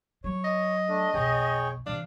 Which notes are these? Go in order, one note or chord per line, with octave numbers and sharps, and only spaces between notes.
F#3 C#5
D#5
A3 D4
B1 F2 G#4 C#5 G5
C3 E3 D4 F5